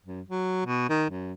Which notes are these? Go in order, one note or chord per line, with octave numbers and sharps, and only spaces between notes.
F#2
F#3
B2
D#3
F#2